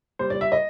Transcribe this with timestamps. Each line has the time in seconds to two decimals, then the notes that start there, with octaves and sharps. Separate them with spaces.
0.19 G3 C5
0.30 D5
0.34 G3
0.41 E5
0.52 D#5